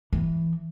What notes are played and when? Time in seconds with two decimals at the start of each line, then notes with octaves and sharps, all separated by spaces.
0.13 E3